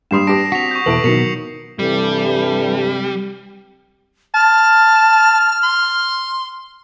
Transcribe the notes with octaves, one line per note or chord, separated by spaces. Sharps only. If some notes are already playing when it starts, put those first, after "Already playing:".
G2 G3 C6 D#6 C7 E7
D4 G4 A#6 D7 E7
C4 F#4 B6 F7
C#6 G6
E2 B2 E4 A4 B4 D7 F#7
B2 D#3 F#3 A#4 C7 C#7 F7
G2 C3 E3 G3 G4 A4
A5 F6
C6